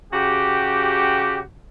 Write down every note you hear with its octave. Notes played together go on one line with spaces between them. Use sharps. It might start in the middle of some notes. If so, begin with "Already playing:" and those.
C#3 F#4 G4